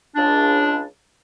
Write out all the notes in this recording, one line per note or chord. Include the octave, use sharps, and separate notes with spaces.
C#2 D4